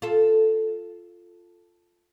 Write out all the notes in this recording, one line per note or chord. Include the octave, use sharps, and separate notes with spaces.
F4 A4